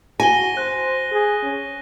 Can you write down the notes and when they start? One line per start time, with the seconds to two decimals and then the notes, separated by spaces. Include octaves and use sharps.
0.20 F#4 G#5 A#6 D#7 G7
0.57 C5 F#6
1.12 G#4
1.43 C#4